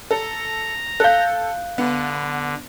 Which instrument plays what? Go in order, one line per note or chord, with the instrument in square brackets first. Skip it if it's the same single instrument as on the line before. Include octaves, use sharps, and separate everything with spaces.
[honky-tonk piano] A4 [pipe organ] A#5
[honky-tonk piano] A4 G6 [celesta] F5 F#6
[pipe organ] D3 [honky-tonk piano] B3